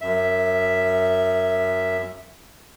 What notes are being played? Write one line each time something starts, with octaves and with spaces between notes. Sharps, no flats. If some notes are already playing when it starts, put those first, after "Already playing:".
F#2 E5